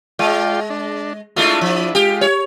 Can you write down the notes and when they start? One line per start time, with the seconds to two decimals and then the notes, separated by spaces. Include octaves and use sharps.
0.19 G#3 F4 D5 G5
0.70 D4
1.36 G#3 A3 D4 E4 F4
1.61 F3
1.95 G#3 F4 G4
2.21 C#5